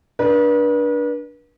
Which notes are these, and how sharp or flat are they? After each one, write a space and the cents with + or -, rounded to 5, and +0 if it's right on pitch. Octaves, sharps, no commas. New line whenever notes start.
D4 +0 B4 -40